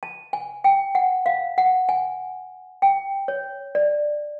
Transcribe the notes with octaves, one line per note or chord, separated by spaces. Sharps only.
A5
G#5
G5
F#5
F5
F#5
G#5
G5
C#5
D5